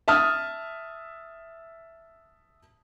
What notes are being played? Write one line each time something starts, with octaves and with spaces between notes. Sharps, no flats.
E5 A5 D#6 F6